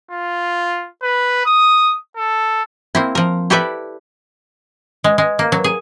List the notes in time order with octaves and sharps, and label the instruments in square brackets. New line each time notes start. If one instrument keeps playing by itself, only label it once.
[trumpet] F4
B4
D#6
A4
[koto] A#3 C4 E4
F3 A#4
E4 G4 A4 B4 D5 E5
G#3
G#3
A#3
F#3
G#4